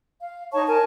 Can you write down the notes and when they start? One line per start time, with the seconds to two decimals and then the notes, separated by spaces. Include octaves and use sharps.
0.19 F5
0.52 D#4 C#5 A5 C#6
0.67 A#4 G#5 A5